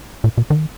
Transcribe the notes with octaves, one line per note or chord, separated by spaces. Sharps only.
A#2
B2
D#3